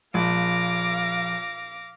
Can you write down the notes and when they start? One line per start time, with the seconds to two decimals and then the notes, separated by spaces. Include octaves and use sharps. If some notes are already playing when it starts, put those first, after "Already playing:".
0.14 A#1 F5 D6 A#6